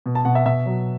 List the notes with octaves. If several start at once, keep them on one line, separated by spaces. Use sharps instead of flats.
B2
A5
B2 F#5
E5
B2 E5
F#3